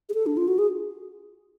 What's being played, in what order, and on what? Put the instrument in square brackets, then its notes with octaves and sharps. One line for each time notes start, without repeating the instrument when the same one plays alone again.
[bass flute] G#4
A4
D4
F4
F#4
G#4